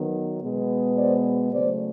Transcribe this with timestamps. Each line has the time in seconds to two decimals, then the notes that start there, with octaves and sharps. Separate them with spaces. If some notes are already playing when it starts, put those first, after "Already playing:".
Already playing: D#3 F#3 B3
0.42 B2 G#3 B3
0.97 C5 D5
1.53 C#3 F#3 A3 C5 D5